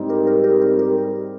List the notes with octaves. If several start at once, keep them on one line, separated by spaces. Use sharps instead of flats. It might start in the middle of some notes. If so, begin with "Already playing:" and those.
Already playing: G#2 G3 C4 D#4
G4 A#4
G4 A#4
G4 A#4
G4 A#4
G4 A#4